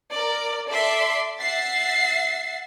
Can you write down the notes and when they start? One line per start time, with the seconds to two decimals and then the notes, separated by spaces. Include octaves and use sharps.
0.13 A#4 D5
0.69 A4 D5 E5 C6 D6
1.40 E5 F#5 A6 C7